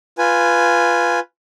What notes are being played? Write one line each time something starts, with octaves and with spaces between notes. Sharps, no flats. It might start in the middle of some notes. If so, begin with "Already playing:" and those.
F4 B4 G#5